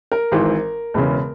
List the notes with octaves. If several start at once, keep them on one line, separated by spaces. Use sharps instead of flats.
A#4
G#1 G#2 E3
E1 E2 C#3